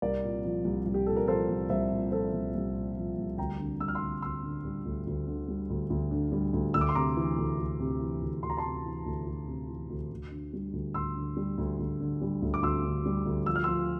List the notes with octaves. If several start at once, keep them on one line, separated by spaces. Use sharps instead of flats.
C2 A#4 D5
A#2
F3
C2
C2
G4
A#2 A4
A#4
F3 A4 C5
C2
C2 C5 E5
A#2
F3 A4 C5
C2
C2
A#2
F3
C2
D2 G5 A#5
D3
G3 E6
F6
C6 E6
D2
D2 C6 E6
D3
G3
D2
D2
D3
G3
D2
D2
D3
G3
D2
D2 E6
D6
C6
C3 A#5 D6
E3
D2
D2
C3
E3
D2
D2 C6
A#5
A5 C6
C3
E3
D2
D2
C3
E3
D2
D2
D3
G3
D2
D2 C6 E6
D3
G3
D2
D2
D3
G3
D2
D6
D2 C6 E6
D3
G3
D2
F3 E6
F6
F3 C6 E6